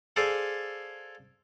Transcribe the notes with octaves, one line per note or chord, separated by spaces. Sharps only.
G#4 A4 C5 D5 F5 G#5